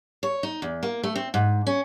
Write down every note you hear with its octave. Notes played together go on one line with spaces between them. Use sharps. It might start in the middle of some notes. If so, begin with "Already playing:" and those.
C#5
D#4
E2
A#3
A3
C4
G#2
C#4